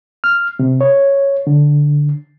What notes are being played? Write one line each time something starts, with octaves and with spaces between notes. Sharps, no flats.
F6
C3
C#5
D3